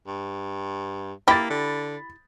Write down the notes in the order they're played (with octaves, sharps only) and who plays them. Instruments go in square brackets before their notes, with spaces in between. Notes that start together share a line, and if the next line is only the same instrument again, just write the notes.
[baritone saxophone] G2
[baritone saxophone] A#3 [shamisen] E4 G4 [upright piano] B5 A6
[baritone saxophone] D3